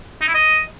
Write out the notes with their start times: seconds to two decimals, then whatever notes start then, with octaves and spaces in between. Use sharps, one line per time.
0.21 D#4
0.28 E4
0.34 D#5